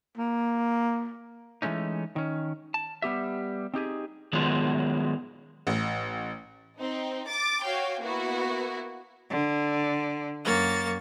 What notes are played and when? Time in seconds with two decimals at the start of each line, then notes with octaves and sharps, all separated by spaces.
0.17 A#3
1.62 E3 G#3 A3 C#4 D#4
2.16 D#3 C#4
2.74 A5
3.02 G3 B3 G4 E5
3.74 C4 D#4 G4 G#4
4.33 D#3 F#3 G#3 B3 F4
5.67 A1
6.79 C4 D#4
7.29 D6 A6
7.64 F#4 C#5 F5 G5
8.01 A#3 B3 E4 F#4
9.29 D3
10.45 F#2 A#3 C#5 A6